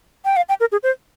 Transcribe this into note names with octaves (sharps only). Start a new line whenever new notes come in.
G5
F5
G5
A#4
G#4
C5